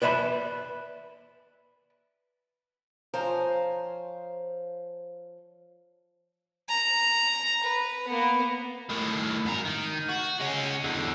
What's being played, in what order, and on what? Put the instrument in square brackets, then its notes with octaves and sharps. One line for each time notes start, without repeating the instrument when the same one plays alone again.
[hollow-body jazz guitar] B4 D5 E5 A5 B5
[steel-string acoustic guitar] F3 C5 C#5 F5 G#5 A#5
[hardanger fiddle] A#5
B4
A#3 B3
[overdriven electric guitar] A2 D#3
G#2 A#4
D#3
F#4
G#3 C#4
E2 D3